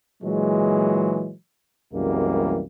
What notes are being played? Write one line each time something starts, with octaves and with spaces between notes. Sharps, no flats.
A#2 E3 F#3 G#3
C2 F#2 E3 G3 G#3 A#3